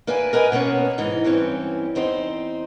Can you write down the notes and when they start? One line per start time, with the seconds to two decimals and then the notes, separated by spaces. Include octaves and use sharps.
0.07 A#3 B4 D5 E5 G#5
0.33 A#4 B4 D#5 G5 G#5
0.52 B2 A#3 B3 C#4
0.98 G#2 E3 D#4
1.24 G2 E3 C4 C#4
1.95 E2 C4 D#4 C5